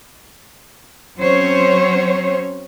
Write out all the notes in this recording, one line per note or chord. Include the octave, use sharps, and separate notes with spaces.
F#3 C4 C#4 C5 C#5